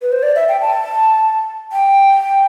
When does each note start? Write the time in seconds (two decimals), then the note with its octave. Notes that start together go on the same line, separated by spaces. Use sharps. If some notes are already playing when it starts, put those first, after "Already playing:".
0.02 B4
0.12 C5
0.23 D5
0.36 E5
0.48 G5
0.61 A5
1.72 G5